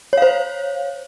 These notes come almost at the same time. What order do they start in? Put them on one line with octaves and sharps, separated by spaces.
C#5 F5 C5